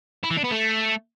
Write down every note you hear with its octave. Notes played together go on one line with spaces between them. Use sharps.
E4
E3
D4
B3
A3